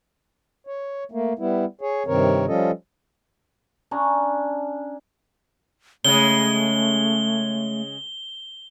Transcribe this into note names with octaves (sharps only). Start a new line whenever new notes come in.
C#5
A3 A#3
G3 B3 E4
G#4 C#5
G2 C3 D#3 C4 A#4 C#5
F3 G3 C#4 F4 A4 D#5
C#4 D4 A#5
C#3 G#3 A3 G7